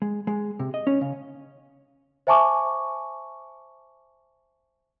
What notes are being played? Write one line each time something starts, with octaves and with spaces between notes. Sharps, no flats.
G#3
G#3
C3
D#5
C#4
C#3
C5 E5 G#5 A5 C#6 D6